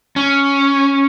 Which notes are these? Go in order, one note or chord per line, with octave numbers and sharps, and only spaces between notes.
C#4